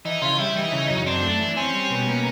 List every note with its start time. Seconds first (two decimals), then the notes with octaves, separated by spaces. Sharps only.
0.05 E3 D#4
0.22 C#3 F4
0.39 G3 E4
0.56 E3 D#4
0.72 C#3
0.90 F#2
1.06 C4 D4
1.23 A3
1.40 E3
1.56 C4 C#4
1.73 G3
1.90 B2
2.07 A#3